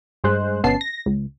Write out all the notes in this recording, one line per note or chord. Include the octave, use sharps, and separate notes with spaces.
G2 G#3 C5 F#6
G1 B2 B3 C#4 A5 C7
A#6
C#2